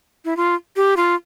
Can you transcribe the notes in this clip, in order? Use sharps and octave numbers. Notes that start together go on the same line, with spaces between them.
E4
F4
G4
F4